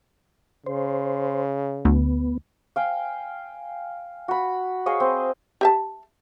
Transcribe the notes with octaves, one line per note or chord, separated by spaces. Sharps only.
C#3 C5
D2 B3
F5 G5 G#5
F#4 B5
G#4 C#5 D#5 F5
C4
G4 E5 A5